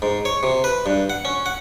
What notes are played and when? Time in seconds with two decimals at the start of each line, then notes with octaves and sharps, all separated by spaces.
0.02 G#2
0.25 C#5
0.43 C3
0.64 B4
0.86 G2
1.10 F#5
1.25 C#4
1.46 F#5